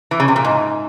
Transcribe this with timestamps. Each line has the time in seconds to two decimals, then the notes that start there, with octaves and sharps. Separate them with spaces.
0.11 E3
0.20 C#3
0.28 C3
0.36 A#2
0.45 G#2